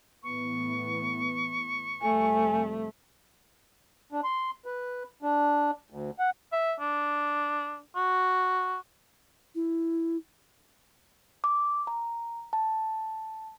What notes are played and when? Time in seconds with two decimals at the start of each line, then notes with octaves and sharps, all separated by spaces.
0.23 A2 E3 B3 C#6
2.02 F2 C3 G3 A3 G#5
4.12 D4
4.24 C6
4.66 B4
5.22 D4
5.90 D2
6.19 F#5
6.52 E5
6.80 D4
7.96 F#4
9.55 E4
11.44 D6
11.87 A#5
12.53 A5